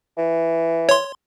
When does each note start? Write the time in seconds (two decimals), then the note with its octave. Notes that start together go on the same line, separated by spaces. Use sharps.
0.18 E3
0.89 C#5 C6